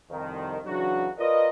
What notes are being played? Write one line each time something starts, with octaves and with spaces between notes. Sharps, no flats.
C2 F2 D#3
C#3 E3 F#3 D4 F#4
F4 A#4 B4 D5 D#5